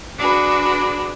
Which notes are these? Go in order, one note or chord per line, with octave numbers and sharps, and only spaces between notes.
D4 F#4 G#4 B4